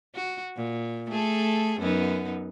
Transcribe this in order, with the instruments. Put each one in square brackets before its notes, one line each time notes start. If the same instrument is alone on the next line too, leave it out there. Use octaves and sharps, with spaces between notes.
[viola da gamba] F#4
A#2
A3 G#4 A4
F#2 B3 D#4